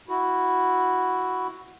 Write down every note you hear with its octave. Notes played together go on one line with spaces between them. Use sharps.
E4 F#4